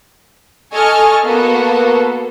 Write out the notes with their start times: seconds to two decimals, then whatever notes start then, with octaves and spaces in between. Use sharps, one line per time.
0.73 A4 D#5 G#5 C#6 F6
1.24 A#3 B3 F#4 A4